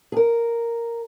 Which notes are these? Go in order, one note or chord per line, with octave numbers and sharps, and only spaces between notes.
G#4
A#4